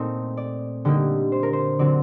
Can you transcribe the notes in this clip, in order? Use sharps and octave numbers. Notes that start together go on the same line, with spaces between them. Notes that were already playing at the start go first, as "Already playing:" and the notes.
Already playing: A#2 A3 C4 D#4
D5
D3 G3 A#3 D#4
C5
A#4
C5
D3 F#3 C4 D5